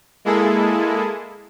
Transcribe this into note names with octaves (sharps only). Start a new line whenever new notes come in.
G#3 A#3 E4 G#4 A4